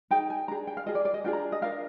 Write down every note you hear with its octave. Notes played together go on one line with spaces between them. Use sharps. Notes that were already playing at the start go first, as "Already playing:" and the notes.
D#4 G#4 G5
G#5
D4 G#4 A#5
G5
F5
F4 G#4 D#5
D5
D5
D#5
D4 F4 G#4 G5
A#5
D#5
D4 F4 A#4 F5